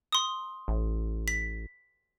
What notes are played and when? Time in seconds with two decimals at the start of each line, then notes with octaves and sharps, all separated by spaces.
0.12 C6 D#6
0.68 A1
1.28 B6